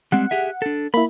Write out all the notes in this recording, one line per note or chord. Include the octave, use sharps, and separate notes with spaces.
G3 G#3 C4 F#5
G4 G#4 E5
D4 A4
A#3 E4 B5